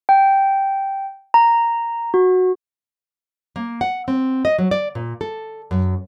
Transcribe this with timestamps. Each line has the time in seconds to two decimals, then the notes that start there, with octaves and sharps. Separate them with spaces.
0.09 G5
1.34 A#5
2.14 F#4
3.56 A#3
3.81 F#5
4.08 C4
4.45 D#5
4.58 F#3
4.71 D5
4.95 A#2
5.21 A4
5.71 F#2